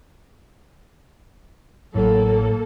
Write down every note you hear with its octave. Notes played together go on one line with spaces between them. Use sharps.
A1 A2 F#3 A#3 A4